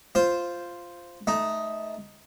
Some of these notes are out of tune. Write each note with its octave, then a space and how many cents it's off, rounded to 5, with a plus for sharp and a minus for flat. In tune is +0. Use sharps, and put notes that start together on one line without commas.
F4 -5 C5 +0
A3 -15 D#4 +5